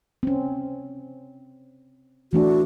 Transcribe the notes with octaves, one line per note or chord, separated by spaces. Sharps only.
C4 C#4
E3 A3 D4 F#4